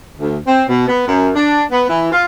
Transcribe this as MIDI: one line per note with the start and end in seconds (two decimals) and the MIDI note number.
0.18 0.36 38
0.46 0.63 60
0.68 0.86 47
0.88 1.05 59
1.07 1.30 42
1.35 1.62 62
1.70 1.85 59
1.88 2.08 52
2.12 2.25 65